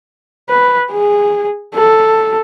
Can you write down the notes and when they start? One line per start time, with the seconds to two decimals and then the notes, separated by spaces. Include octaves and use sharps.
0.50 B4
0.92 G#4
1.74 A4